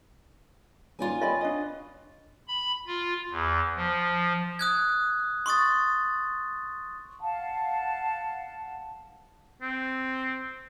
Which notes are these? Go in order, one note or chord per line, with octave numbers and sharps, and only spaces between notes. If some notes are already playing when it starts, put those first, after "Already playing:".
C#4 D#4 F4 D5 G#5
C#5 D#5 G5 B5
D4 D#5
B5
F4
E2
F3
D#6 F#6 G#6
C6 C#6 D#6 A6
F5 F#5 A5
C4